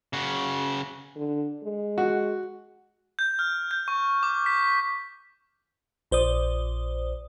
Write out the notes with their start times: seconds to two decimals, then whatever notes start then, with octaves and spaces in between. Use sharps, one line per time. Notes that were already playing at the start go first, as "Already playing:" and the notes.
0.13 C#3 F#4
1.16 D3
1.64 G#3
1.98 F#4
3.19 G6
3.39 F6
3.71 G6
3.88 C#6
4.23 D6
4.46 B6
6.11 A#1 C5 D5 D#6